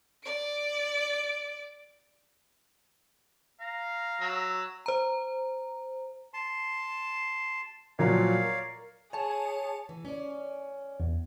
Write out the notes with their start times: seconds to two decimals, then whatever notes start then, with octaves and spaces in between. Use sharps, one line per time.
0.23 D5 D7
3.61 F5 A#5
4.21 F#3 E6
4.86 C5 A#5
6.34 A5 C6
7.99 A#2 F3 F#3 C#5 D5 F5
8.42 A#4
9.13 G#4 C#5 A5
9.89 E3
10.05 C#4 D5
11.00 E2